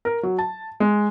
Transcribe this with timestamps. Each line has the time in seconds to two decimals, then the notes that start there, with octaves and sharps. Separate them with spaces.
0.05 A#4
0.23 F#3
0.39 A5
0.80 G#3